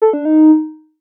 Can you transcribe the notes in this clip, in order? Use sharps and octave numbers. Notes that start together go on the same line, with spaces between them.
A4
D4
D#4